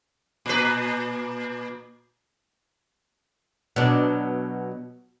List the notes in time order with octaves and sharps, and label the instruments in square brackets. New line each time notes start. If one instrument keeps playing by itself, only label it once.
[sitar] A#2 B4
[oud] B2 F#3 D4